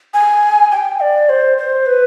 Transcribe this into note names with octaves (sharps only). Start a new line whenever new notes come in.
G#5
G5
D5
C5
C5
B4